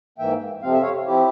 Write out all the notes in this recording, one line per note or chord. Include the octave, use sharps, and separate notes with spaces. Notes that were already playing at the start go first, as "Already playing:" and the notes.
G#2 E3 A#3 E5 G5
F2 C3 F3 C4 F5
E5
C#5 F5
F3 C4 E4 G4